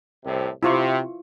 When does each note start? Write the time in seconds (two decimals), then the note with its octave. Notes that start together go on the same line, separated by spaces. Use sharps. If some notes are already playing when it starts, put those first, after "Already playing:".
0.23 C2 A2 C3
0.63 C3 E4 F4 C#6